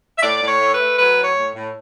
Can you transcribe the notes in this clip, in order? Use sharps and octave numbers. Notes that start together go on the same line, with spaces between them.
E5
A2 D5
A2
C#5
A3
B4
A3
F#3 B4
A2
C#5
A2
A2